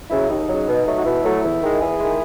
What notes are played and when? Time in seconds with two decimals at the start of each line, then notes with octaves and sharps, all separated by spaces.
0.10 C#3 F#3 E4
0.29 D#2 D#4
0.49 C#3 F#3
0.68 B2
0.86 F#3 A3
0.98 F#4
1.05 B2 E4
1.24 F#3 A3
1.43 E2
1.61 D#3 G#3
1.80 E2 E4 G#4
1.98 D#3 G#3